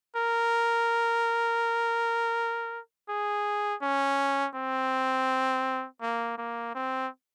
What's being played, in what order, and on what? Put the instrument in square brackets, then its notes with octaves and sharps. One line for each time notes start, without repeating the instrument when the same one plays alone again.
[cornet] A#4
G#4
C#4
C4
A#3
A#3
C4